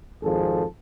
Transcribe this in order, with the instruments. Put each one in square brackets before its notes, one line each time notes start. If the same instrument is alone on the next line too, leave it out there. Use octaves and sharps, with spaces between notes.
[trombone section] G#1 F2 F3 G#4 A4